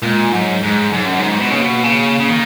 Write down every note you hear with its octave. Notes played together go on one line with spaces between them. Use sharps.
A#2 G#3
G#2 F#3
G#2 G#3
G#2 F#3
F#2
F#3
G#2 G#3
B2
C#3 A#3
B2
C#3
C#3
D#3